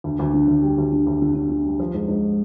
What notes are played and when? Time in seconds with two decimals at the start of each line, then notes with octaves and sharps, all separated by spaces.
0.04 D2
0.19 D2
0.34 D3
0.48 D2
0.63 G3
0.78 D2
0.92 D3
1.07 D2
1.22 D3
1.35 D3
1.50 D3
1.65 G3
1.80 F3
1.94 G#2
2.08 G#2